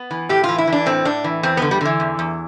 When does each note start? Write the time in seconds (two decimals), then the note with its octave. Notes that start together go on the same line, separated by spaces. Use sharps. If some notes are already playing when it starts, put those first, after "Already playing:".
Already playing: B3
0.11 E3
0.29 A2 G4
0.44 F4
0.49 E3
0.58 E4
0.67 E3
0.73 D4
0.86 A2 C4
1.05 A2 D4
1.24 E3
1.43 E2 C4
1.57 D3 B3
1.71 G3
1.81 D3 E3
2.00 E2
2.19 E2